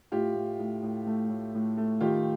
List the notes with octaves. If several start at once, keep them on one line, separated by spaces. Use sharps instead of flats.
A2 F4 G4
A2
A2
A2
A3
A2
A2
A3
D#3 F4 G4